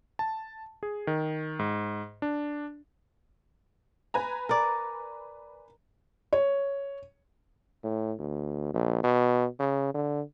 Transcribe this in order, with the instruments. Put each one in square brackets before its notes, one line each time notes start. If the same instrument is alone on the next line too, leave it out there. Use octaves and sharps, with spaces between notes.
[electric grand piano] A5
G#4
D#3
G#2
D4
[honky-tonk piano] B4 G#5 A#5
[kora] A#4 D5
[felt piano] C#5
[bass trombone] A2
D2
A#1
B2
C#3
D3